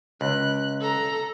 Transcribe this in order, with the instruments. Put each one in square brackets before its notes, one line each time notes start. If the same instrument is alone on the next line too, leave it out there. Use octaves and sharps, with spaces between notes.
[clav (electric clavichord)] C#2 [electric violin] F#6
[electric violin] A4 A#5